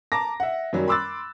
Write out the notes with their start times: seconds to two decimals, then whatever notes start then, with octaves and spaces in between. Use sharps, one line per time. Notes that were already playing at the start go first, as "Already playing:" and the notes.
0.12 A5 A#5 D6 A#6
0.40 E5 F#5
0.73 F#2 D#3 F#3 G3
0.88 B5 C6 D6 E6 F#6 A6